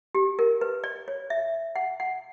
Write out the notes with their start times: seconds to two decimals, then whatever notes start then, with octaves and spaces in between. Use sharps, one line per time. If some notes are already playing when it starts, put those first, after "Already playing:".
0.15 G4
0.39 A#4
0.61 B4
0.84 D5
1.08 C#5
1.30 E5
1.76 F#5
2.00 F#5